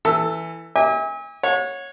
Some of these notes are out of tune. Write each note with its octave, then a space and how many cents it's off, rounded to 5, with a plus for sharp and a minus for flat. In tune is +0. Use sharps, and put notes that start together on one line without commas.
E3 +0 A4 +15 E6 +0
E5 -45 G#5 -35 D6 +0
C#5 -5 F#5 -35